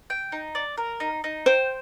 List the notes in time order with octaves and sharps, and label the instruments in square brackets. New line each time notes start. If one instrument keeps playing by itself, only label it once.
[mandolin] G5
D#4
D5
A#4
D#4
D#4
[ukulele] C5 [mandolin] G5